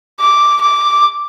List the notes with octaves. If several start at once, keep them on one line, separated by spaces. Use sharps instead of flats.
D6
D6